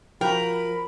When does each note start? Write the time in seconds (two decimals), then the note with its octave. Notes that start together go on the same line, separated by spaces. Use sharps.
0.21 F3 F#4 A#4 G5 B5